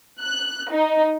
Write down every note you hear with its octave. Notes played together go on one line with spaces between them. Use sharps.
F#6
D#4